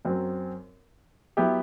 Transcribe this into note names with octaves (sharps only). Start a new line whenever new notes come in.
F#2 F#3 C4
F#3 B3 E4 G4